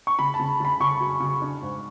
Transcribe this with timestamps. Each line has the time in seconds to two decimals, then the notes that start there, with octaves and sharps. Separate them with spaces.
0.07 C#6
0.19 C#3 B5
0.34 A5
0.39 C#3
0.60 C#3 B5
0.80 C#3 C#6
1.00 F#3
1.20 C#3
1.42 D4
1.62 G#2